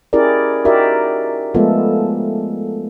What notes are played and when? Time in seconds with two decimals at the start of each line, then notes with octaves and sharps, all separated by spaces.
0.13 C#4 E4 G4 G#4 A#4 D5
0.65 D#4 F#4 G4 A#4 D5 E5
1.54 F3 G#3 A3 B3 F4 A4